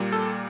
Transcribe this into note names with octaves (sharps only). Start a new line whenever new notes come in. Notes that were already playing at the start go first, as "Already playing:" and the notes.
Already playing: A#2 G3 A#3
A4